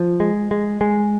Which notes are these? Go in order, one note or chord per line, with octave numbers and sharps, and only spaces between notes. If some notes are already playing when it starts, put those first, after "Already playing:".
Already playing: F3
G#3
G#3
G#3